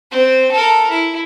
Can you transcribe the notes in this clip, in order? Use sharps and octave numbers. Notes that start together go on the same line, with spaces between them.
C4 C5
A4 A#4
E4